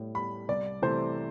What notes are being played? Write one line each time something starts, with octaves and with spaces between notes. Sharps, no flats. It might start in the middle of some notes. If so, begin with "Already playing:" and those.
Already playing: A2 G3
G3 B5
C2 D5
C3 E3 A3 C5